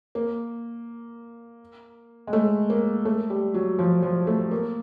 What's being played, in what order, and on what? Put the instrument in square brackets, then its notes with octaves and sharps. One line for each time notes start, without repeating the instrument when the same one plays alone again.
[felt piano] A#3
G#3
A3
A#3
A3
G3
F#3
F3
F3
A3
A#3